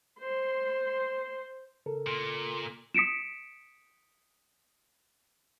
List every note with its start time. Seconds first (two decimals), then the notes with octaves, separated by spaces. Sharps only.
0.20 C5 C6
1.86 C#3 A4 A#4
2.07 A#2
2.94 D#6 B6 C#7 D7 E7